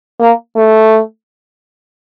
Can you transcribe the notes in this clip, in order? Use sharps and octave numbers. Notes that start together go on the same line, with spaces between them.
A#3
A3